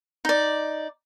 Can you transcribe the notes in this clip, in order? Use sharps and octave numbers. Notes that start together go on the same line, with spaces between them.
D#4 D5